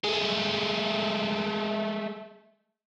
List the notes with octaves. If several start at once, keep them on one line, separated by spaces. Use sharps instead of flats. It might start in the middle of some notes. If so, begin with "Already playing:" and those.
G#3 A3